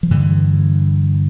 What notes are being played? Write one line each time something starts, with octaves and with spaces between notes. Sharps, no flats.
F3
G2 D3 E3